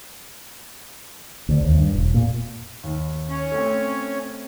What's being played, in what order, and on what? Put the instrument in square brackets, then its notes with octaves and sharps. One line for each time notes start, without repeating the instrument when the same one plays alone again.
[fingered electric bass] D2
D#2
G2
E1
A#2
[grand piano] D#2
[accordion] C#4
[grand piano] A3 C4